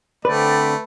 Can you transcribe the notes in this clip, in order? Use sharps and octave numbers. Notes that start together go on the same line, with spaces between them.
D3 A3 C4 B4 D5 B5